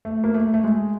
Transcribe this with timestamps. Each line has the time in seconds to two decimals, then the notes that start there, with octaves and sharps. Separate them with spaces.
0.05 A3
0.24 A#3
0.34 A3
0.54 A3
0.64 G#3